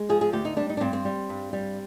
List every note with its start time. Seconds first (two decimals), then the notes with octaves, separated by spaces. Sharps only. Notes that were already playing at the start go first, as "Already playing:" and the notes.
Already playing: G#3
0.09 F3 G#4
0.21 G#4
0.33 D2 G4
0.45 D#4
0.57 G3 D4
0.70 D#4
0.77 D4
0.80 G2 C4
0.93 C4
1.05 G3
1.29 G2
1.53 G3